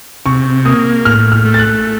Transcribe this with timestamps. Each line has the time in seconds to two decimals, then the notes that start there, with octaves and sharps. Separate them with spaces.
0.26 C3 C#6
0.65 A#3 D#6
1.05 A2 F6
1.32 F6
1.45 A3
1.54 A6
1.59 F#6